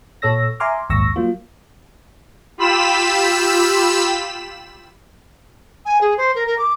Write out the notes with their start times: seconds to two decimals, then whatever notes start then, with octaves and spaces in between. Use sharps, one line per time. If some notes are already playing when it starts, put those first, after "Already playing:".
0.22 A#2 A4 C#5 E6 A#6
0.60 E5 G#5 A#5 C6 D6 F6
0.90 A#1 D#2 G#2 C#6 E6 A#6
1.16 F#3 A#3 F4
2.58 F4 G4 B5 E6 B6 E7
5.85 G#5
6.00 G#4
6.17 C5
6.35 A#4
6.46 A#4
6.58 D6